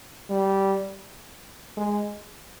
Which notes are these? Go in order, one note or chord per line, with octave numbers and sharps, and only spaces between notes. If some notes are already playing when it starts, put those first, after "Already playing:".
G3
G#3